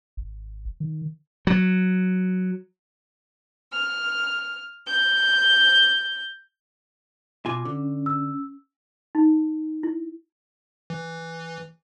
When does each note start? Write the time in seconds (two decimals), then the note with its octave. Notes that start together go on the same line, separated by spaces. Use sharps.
0.17 G#1
0.80 D#3
1.47 F#3
3.71 F6
4.86 G6
7.46 B2 F4 G#5 D6
7.65 D3 C#4
8.06 E6
9.15 D#4
9.83 E4
10.90 E3